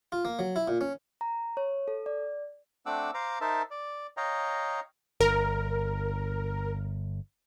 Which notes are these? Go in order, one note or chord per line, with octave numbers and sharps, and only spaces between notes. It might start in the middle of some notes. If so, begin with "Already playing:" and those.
F4
A#3
F#3
E4
A#2
C#4
A#5
C#5
A4
D5
A3 C4 D4 F#5 D6 E6
C5 F5 A#5 D6
D#4 A#4 C5 E5 A5
D5
C#5 D#5 F5 G5 A#5
G1 A#4